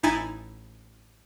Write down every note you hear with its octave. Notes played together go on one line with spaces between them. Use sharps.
A1 D#4 E4 G#5 A6